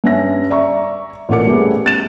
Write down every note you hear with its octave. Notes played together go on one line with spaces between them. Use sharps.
G2 C#4 E5 A#6
D5 E5 A#5 C#6
A1 A#2 A#3 A4 D6 C#7
G3 A3 B3 C#4 G#4
A6 E7